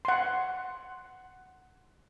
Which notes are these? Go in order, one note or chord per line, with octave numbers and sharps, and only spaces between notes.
F#5 C6